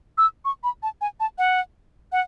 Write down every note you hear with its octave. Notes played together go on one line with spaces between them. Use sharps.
E6
C#6
B5
A5
G#5
A5
F#5
F#5